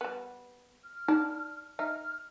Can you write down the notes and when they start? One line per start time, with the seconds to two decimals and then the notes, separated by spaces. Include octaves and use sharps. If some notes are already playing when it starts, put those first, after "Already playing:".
0.01 G3 B3
0.84 F6
1.08 D4 D#4
1.79 D#4 E5 F6